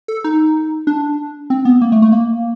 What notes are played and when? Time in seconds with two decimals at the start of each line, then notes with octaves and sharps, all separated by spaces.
0.08 A4
0.24 D#4
0.87 D4
1.50 C4
1.65 B3
1.81 A#3
1.92 A3
2.02 A3
2.12 A#3